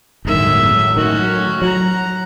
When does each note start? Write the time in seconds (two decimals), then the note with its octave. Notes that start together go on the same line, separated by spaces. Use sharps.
0.25 G1 E2 A2 D#3 F#3 G#3 E5
0.97 D#3 C#4 F#4
1.62 F#3 F#5 A#5